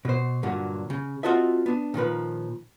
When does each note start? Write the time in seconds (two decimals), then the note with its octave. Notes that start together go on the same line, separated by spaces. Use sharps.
0.05 B2 C5
0.43 G2 A#2 D3 F#3
0.90 C#3
1.23 C4 F4 F#4 A4 D#5 E5
1.66 B3 D4
1.94 A#2 D#3 F3 B4